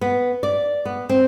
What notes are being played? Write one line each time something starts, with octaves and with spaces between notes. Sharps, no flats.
B3
D5
B3
C4